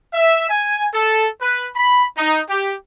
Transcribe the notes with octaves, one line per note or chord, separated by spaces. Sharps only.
E5
G#5
A4
B4
B5
D#4
G4